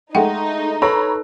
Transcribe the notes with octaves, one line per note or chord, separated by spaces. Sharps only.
G#3 A3 D#4 F#5 G5
A4 B4 C#5 A#5 B5